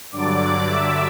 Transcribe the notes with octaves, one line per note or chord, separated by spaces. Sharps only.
G2 D3 F#3 D5 D6
E5 E6